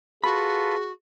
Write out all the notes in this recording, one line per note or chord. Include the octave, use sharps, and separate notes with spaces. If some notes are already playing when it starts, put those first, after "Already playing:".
F4 F#4 G#4 A4 B4 B5